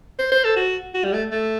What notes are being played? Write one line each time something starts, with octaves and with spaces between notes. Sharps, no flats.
C5
C5
A4
F#4
F#4
G3
A3
A3